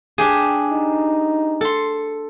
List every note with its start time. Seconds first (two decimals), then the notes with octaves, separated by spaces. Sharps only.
0.18 D4 G4 G#4
0.72 D#4
1.61 A4 C6